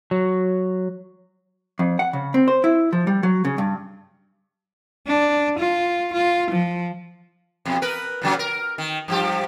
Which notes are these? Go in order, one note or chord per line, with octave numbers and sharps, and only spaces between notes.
F#3
F2
F#5
C#3
C4
C5
E4
F3
G3
F#3
C#3
G2
D4
F4
F4
F3
F2 B2
A#4 B4
A#2 C#3 F#3
A#4
D#3
G2 F3 G4